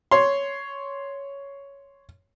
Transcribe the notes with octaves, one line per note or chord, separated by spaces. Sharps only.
C#5 C6